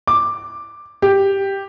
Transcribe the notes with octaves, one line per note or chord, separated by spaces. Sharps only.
D6
G4